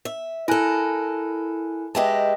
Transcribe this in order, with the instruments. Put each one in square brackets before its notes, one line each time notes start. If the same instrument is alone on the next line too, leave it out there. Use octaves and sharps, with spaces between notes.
[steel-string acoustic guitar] E5
[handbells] E4 G#5 F#6 [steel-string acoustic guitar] A4 A#4
[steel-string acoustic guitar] G#3 G4 B4 [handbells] D#5 E5 A5